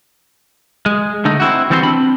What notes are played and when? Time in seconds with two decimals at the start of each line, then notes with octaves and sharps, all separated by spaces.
0.86 G#3
1.25 D3 A3 D#4
1.40 C4 E4 F#4
1.70 E3 G3 C4 F#4 C#5 C6
1.83 C4 D4 B5